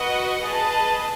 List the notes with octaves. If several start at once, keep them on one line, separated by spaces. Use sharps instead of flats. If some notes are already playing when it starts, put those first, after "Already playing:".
Already playing: F#4 B4 D#5 F#5
G#4 B4 D#5 A5